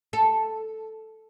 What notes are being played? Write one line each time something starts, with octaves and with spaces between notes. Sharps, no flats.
A4